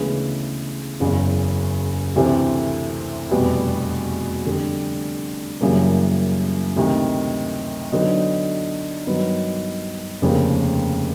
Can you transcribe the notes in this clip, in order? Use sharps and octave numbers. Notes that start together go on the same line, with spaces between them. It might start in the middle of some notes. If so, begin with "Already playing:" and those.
Already playing: D2 C#3 E3 G#3 B3
F#1 E2 C#3
D2 C3 E3 A3 C4
F1 E2 B2 G3 B3
F2 D3 G3
F#2 C#3 E3 G3 A#3
D2 C3 D#3
D3 F#3 B3 D#4
G2 D#3 F#3 B3 D#4
F1 D#2 C#3 F3 A#3